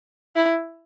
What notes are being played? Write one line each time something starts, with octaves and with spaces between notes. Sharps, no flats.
E4